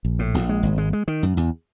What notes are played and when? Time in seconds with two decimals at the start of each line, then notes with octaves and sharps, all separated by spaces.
0.05 A#1
0.19 A2
0.34 A#1
0.49 G#3
0.63 G#1
0.78 G#3
0.93 G#3
1.08 D#3
1.23 F#2
1.37 E2